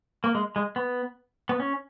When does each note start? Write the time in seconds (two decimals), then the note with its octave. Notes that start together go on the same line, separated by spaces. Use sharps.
0.24 A#3
0.35 G#3
0.56 G#3
0.76 B3
1.49 B3
1.60 C#4